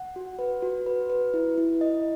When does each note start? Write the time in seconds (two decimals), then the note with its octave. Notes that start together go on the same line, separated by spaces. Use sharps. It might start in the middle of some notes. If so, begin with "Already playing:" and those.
Already playing: F#5
0.16 F#4
0.39 B4
0.62 F#4
0.86 B4
1.10 B4
1.34 E4
1.58 E4
1.81 D#5